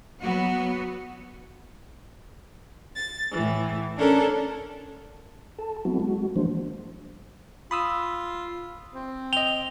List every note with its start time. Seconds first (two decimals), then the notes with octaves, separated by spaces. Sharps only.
0.21 F#3 B3 F#4
2.95 A6
3.33 A2 E3
3.98 C#4 D4 A4 A#4
5.59 A4 A5
5.85 F#3 B3 C4 E4 F#4
6.00 G#3 F#4
6.36 E3 F3 G#3 A#3 D4 C5
7.71 F4 B5 D#6 E6
8.95 C4
9.33 D#5 G5 F7 G7